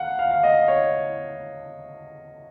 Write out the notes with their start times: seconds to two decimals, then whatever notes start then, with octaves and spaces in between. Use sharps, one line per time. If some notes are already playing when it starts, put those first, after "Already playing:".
Already playing: F5 F#5
0.19 F5
0.31 F5
0.43 D#5
0.68 C#5